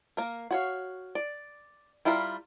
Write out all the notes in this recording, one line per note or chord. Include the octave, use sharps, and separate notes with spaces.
A#3 A#4
F#4 C#5 F5
D5
G3 E4 F4 A#4 B5